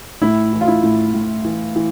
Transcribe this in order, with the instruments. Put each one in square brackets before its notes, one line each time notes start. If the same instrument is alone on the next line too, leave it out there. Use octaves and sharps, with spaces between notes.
[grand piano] A2 E4
E3
F4
E4
A2
A2
E3
E3